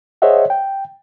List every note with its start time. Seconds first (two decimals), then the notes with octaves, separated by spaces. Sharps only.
0.22 G#4 C5 C#5 D#5 E5 F#5
0.50 G5